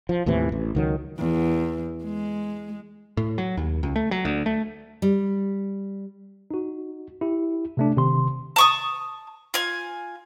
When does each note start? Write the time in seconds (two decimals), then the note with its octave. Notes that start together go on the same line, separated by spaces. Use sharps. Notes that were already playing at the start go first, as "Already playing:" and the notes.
0.09 F3
0.26 D#2 A2 C3 E3
0.52 A1
0.75 C#2 D#3 F#3
1.18 E2
2.03 G#3
3.17 A2
3.38 F#3
3.57 D#2
3.83 C#2
3.96 A3
4.11 F#3
4.25 D2
4.46 A3
5.02 G3
6.51 D#4 F#4
7.21 E4 G4
7.77 C3 A3 D4
7.97 C3 D#3 C6
8.56 A5 C#6 D#6
9.54 F4 G#5